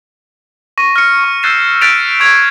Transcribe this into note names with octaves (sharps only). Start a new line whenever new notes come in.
C#6 A#6 D#7
F6 C#7
C#6
E6 F#6 G6 A6 C7 E7
F#6 G6 A6 B6 D7 F7
C#6 G#6 F7